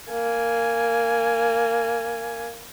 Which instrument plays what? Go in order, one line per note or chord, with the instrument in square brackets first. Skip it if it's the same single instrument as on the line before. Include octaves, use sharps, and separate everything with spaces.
[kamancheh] A#3 G#5